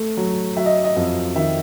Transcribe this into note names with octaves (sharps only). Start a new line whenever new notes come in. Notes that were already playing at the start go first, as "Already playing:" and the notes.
Already playing: A3
F#3
F#3 E5
D#5
D#5
F2
D#3 E5